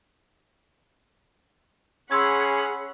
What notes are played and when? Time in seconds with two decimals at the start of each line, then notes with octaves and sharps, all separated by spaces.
2.11 C#4 G#4 F#5 B5 C6 E6 G#6